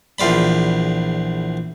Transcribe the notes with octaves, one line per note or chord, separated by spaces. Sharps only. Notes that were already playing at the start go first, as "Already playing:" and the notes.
A#1 E2 F4 D5 B5